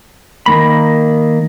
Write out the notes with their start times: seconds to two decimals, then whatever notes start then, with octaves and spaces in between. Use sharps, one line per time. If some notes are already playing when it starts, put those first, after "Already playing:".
0.46 D#3 A#3 B5